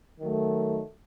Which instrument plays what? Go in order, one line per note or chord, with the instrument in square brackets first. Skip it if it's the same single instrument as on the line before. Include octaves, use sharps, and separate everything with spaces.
[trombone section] D#3 F#3 A3